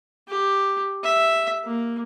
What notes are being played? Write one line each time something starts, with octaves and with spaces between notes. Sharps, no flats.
G4
E5
A#3